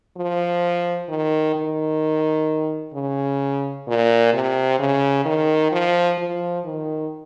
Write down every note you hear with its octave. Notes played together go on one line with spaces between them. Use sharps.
F3
D#3
D#3
C#3
A#2
C3
C#3
D#3
F3
F3
D#3